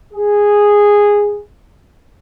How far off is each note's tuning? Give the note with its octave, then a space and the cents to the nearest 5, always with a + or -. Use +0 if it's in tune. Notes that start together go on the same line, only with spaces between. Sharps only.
G#4 -10